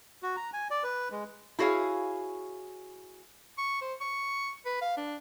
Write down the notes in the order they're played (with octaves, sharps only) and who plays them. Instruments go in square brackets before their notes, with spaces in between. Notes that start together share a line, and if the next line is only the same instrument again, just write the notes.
[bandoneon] F#4
A#5
G#5
D5
B4
G#3
[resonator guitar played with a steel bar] E4 F#4 G#4 C#5 F5
[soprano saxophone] C#6
C5
C#6
B4
F5
D4